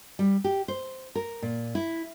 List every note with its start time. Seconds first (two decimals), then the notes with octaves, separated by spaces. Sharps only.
0.19 G3
0.44 G4
0.68 C5
1.15 A#4
1.42 A#2
1.75 E4